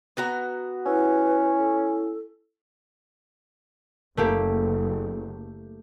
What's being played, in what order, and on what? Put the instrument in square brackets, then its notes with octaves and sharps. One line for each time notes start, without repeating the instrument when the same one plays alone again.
[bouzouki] B3 F#4 A#5
[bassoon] C#4 [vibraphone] E4 [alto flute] B4
[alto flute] A4
[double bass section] F#1 [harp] A3 A#3 G4